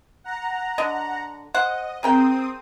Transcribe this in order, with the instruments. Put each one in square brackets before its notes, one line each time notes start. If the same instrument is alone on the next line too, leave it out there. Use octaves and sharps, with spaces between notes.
[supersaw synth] F#5 A#5
[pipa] D3 D#5
[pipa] C5 F#5 [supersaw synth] D#5
[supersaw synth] C4 D#6 [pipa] G#4 A#4 G5